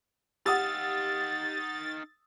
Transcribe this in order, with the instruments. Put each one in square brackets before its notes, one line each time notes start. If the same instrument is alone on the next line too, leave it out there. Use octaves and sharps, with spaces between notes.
[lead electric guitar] D#4 F5 [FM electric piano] G4 [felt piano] F#5 D#6 E6 [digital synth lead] A6